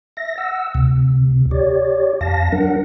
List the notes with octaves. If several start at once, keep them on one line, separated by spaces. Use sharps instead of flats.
E5 A#6
F#5 E6
D2 C3
G4 C#5 D5
F2 F5 A5 A#6
F#3 D4 A#4 F#5